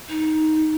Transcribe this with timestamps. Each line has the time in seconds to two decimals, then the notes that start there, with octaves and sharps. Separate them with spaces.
0.08 D#4